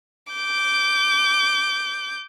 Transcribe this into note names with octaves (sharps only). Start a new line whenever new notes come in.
D6 G6